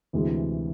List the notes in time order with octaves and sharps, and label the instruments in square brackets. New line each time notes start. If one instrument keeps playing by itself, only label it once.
[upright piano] D2 C3 E3 G#3